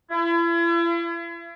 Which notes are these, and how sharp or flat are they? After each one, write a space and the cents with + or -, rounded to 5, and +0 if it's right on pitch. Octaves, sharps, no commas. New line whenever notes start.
E4 +40